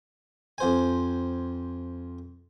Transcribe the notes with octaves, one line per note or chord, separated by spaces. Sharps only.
F2 C5 G#5